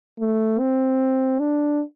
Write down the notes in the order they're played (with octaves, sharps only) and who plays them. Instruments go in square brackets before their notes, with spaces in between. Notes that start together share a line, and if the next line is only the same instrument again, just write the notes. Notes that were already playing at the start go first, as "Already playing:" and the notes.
[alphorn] A3
C4
D4